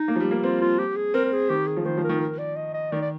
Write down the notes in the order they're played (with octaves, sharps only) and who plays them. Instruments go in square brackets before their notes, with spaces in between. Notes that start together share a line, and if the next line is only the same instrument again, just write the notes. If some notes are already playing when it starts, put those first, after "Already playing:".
Already playing: [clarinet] D#4
[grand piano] A#3
F3
G3
A#3
[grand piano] C4 [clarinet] F4
[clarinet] F4
G4
G#4
[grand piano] C4 [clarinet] A#4
[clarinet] A#4
G#4
[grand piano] D#3 [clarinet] G4
[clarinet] G#4
[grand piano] F3
[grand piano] D#3 [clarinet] C5
[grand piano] F3
[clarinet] A#4
[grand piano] D#3
[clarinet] A#4
D5
D#5
D#5
[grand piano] D#3 [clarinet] D5
[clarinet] D5